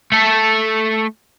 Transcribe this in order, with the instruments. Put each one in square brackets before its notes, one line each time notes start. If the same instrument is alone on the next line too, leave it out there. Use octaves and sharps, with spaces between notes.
[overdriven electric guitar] A3 A4